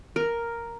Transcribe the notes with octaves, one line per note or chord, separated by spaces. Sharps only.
A#4